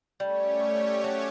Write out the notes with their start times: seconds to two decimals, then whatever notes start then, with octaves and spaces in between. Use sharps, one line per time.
0.19 G3 A3 C#4 G4 C#5
1.04 F#3